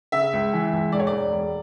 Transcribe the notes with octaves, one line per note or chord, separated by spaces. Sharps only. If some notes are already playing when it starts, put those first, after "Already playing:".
C#3 E5
C#2
E3
C#2
E1 D5
C#5
D5
E1
E1